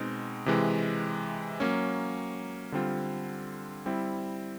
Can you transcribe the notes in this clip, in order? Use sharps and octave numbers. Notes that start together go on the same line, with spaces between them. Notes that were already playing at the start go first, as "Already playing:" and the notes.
Already playing: B2 G#3 C4 D#4
C3 E3 G#3
F#3 A#3 C#4
D3 G3 C4 F4
G3 C4 E4